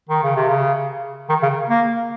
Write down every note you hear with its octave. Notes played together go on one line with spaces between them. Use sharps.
D#3
C#3
C3
C#3
D#3
C#3
A#3